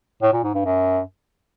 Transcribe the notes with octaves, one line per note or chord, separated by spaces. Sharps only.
A2
A#2
G#2
G2
F#2